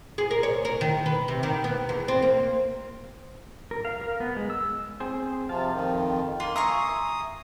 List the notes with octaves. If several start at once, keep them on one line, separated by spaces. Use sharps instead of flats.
G#4
A#4
C#5
A#4
D#3
B4
C3
D#3
B3
E2
C4
A#3
A#4
F5
A#4
B3
G#3
E6
C4 G#4 C5
C3 F3 F5 A5
F2 D#3
A#3 F4 C6
E5 G#5 A#5 C6 C#6 D#6